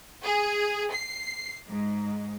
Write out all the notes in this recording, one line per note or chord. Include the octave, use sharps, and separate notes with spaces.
G#4
C7
G#2